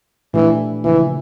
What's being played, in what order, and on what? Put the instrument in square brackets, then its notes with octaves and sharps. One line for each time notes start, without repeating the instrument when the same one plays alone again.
[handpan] A#2 F3 A3 D4 G4 [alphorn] E3
[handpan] C#3 F3 A#3 [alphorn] E3